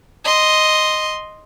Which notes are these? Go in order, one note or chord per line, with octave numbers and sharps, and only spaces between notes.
D#5 C6